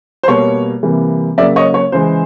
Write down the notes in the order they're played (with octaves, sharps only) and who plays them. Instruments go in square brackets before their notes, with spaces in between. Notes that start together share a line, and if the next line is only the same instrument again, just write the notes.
[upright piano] C5
B2 G3 A#3 C#5
C3 E3 G3 A#3
C#3 F#3 A#3 D5 E5
C#5 D#5
C#5
C#3 E3 G#3 C5